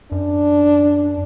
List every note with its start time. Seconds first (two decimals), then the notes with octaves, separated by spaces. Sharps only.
0.12 F#2 D4